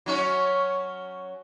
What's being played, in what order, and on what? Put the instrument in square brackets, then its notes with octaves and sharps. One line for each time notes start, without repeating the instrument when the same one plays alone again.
[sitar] F#3 C#4 C#5